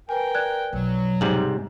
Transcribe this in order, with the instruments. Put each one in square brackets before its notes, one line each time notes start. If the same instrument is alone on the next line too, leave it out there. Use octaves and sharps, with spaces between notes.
[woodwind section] A#4 G5 [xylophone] B4 G#5
[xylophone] D5 F#6 G#6
[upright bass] B1 F2 [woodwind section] F#3
[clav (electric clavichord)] G#2 C3 G3 [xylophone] F#7